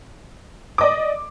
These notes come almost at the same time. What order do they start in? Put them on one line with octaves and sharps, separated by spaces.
D6 D#5 D5